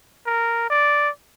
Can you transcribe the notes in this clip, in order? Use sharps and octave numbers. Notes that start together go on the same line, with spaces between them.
A#4
D5